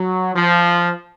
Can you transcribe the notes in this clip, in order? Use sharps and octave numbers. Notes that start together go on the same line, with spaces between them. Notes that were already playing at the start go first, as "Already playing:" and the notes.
Already playing: F#3
F3